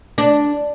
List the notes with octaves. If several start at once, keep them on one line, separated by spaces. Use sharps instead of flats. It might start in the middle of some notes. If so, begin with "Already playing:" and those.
D4